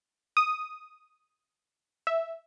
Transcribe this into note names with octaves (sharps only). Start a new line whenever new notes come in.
D#6
E5